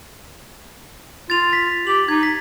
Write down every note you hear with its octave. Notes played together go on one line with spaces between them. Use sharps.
F4 A6 F7
B6
G4 F#7
D#4 G#6
B6